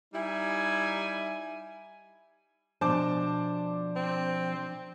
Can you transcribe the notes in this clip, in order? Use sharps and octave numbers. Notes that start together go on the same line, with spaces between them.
G3 D#4 E4 G#5
B2 F3 D4 C5 A5 D6
C4